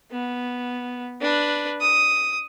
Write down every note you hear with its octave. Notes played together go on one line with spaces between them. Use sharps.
B3
D4 B4
D#6